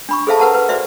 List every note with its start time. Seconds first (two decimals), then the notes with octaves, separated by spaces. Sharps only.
0.09 D4 B5 C#6
0.27 G#4 A4 C5 E5 F5 A5
0.39 A#4 B4 F#5 A5 A#5
0.54 B4
0.69 F#4 C5 D5 E5